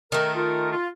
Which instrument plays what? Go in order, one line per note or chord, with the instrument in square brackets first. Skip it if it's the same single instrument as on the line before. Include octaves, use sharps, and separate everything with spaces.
[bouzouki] D#3 A3 [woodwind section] A#4
[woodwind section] F4 A#4
F4